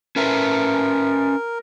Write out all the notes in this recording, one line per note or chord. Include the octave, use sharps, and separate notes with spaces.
C#4 A#4 B4 E5